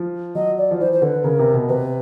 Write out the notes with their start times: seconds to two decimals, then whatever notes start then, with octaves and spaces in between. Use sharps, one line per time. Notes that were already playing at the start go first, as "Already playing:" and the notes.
Already playing: F3
0.35 F#3 D#5
0.58 D5
0.71 F3
0.80 E3 C5
0.92 C5
1.02 D3 B4
1.24 C#3 A#4
1.39 C3
1.54 B2
1.69 C3 B4